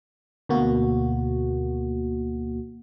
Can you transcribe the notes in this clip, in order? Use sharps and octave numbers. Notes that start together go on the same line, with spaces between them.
D2 B2 A#3 F#4